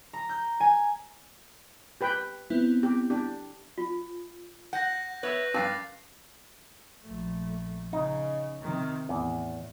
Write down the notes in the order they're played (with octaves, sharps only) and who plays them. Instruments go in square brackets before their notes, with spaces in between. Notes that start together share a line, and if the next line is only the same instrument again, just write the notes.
[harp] A#5
G6
G#5
[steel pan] G4 B4 G5
[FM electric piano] B3 C4 E4
[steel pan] G4
D4 G4
[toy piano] F4
[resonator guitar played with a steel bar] F#5 [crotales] F#6 G6 A#6
[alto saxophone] B4 [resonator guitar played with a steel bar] C#5 E5
[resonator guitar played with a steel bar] G2 F5 [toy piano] C#4 A#4 A5 [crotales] D6 A6 C7
[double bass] A#1 A3
[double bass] C#3 [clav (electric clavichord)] D#4
[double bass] C3 D#3
[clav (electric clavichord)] E2 [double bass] A2